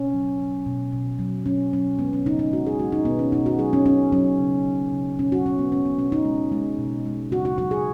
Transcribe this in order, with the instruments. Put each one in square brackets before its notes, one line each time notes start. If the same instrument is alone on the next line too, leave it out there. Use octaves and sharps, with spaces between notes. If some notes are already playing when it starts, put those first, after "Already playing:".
Already playing: [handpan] B2 C#4
F#3
F#3
B2
B2
F#3
F#3 C#4
F#3 C#4
G#3 B3
C#4
C#3 D#4
D#4
G#3 F#4
G#4
G#3 F#4
D#4
B2 B3
C#4
B2 D#4
F#4
F#3 G#4
C#4
F#3 C#4
F#3 C#4
C#3
F#3
C#3
B2 C#4
F#4
B2 C#4
B3
G#3 C#4
B3
B2 C#4
D#4
G#3
G#3
B2
G#3
C#3 F#4
F#4
F#3 F#4
G#4